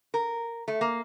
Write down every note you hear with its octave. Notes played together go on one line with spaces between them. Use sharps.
A#4
A3
A#3